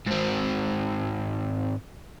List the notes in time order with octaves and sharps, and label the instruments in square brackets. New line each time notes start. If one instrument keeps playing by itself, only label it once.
[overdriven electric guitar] G#2 C4